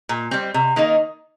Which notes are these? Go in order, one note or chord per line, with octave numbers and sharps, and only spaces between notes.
A#2
G3 C4
C3
D#3 A#3 D#4